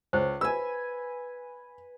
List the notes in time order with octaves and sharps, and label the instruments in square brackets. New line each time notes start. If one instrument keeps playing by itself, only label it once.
[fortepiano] C#2 [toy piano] C5
[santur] B4 G#5 [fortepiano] E6